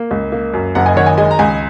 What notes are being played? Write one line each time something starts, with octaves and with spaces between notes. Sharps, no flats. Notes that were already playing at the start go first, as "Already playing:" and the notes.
Already playing: A#3
C#2
A#3
F#2
F#1 F#5 A#5
D#5 G#5
D#3 C#5 F#5
D#5 G#5
G#3 D#5 G#5
A#5
C#2 D#5 G#5